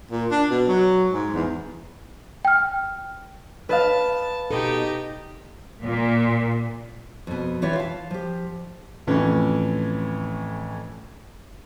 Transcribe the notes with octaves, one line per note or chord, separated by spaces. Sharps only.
A#2
D4
B2
F#3
G#2
E2
G5 F6
B4 D#5 F5 A5
B2 D#4 G4 A4
A#2
F2 B2
E3 F4 G4 C#5 E5
F5 A5
F3 G4
F2 A2 E3 C#4